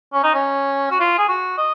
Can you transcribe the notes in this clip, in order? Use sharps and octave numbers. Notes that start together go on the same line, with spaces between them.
C#4
D#4
C#4
F#4
F4
G#4
F#4
D#5